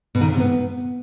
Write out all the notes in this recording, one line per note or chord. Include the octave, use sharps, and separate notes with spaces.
B2
D#3
C#3
C3
B3